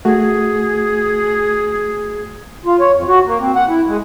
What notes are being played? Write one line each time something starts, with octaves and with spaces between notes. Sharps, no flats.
A3 F#4 G#4
F4
C#5
F2
F#4
A#3
C4
F#5
E4
G#3